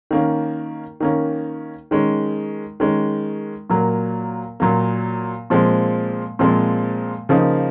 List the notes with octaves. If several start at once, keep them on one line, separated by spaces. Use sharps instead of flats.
D#3 A#3 C#4
D#3 A#3 C#4
D#3 G#3 C#4
D#3 G#3 C#4
A#2 F#3 A#3
A#2 F#3 A#3
A#2 F3 G#3 C4
A#2 F3 G#3 C4
C#3 F3 A#3 D#4